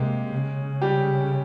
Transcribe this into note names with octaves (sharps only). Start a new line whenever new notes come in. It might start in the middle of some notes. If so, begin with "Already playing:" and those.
Already playing: C3 G#3 A#3 G4
C#3
G3 G4